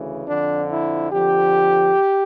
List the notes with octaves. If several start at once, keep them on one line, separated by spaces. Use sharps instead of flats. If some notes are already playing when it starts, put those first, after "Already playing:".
Already playing: D2 C#3 E3
F2 D3 F3 D4
E4
F2 D3 F3 G4